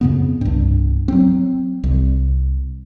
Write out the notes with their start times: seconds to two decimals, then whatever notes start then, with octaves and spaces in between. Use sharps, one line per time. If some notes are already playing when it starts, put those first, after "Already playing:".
0.01 F2 C#3 B3
0.41 C2 G2
1.08 F#3 C4
1.84 C2